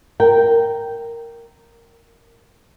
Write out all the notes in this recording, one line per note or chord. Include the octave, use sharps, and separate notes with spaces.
A#4 G5